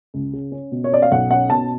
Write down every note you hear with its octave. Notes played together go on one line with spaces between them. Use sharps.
C#2
C#3
C#4
B2
C#5
C#4 D5
F5
B1 F#5
C#4 F#5
B2 A5